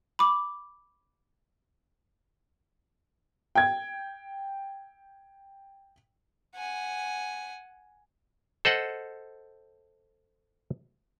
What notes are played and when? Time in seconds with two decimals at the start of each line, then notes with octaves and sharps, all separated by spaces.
0.19 B5 D6
3.55 G5 G#6
6.56 F#5 G#5
8.65 A4 C5 D#5 F#5